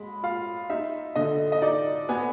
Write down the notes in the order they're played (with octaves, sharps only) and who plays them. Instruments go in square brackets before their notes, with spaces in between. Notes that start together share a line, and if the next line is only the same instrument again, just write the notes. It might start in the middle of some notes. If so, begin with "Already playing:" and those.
Already playing: [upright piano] G#3 B5
F4 F5
D#4 E5
D3 D#5
D#5
D#4 D5
B3 G#5